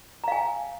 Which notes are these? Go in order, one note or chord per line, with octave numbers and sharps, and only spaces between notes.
F5 G#5 A#5